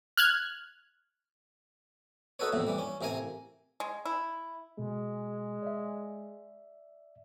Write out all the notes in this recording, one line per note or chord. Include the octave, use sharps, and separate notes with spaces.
F6 F#6 G#6
D#4 F#4 A4 B4 C#5
A#1 E2 A2 C3
E3 G3
C#4
A1 C3 A#4 F5 G#5
G#3
E4
B2 G#3
D5 E5